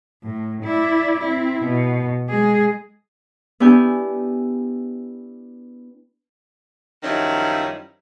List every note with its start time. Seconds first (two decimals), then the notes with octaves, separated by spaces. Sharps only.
0.23 A2
0.63 E4 D5
1.20 C4 E4
1.63 B2
2.29 G#3 G#4
3.60 B3 D4 E4 G4 G#5 G6
7.03 F#2 D#3 F3 G3 C#4 E4